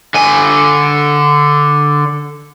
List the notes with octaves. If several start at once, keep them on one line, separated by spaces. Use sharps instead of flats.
D3 G#5